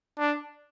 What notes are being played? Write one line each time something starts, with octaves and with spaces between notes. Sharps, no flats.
D4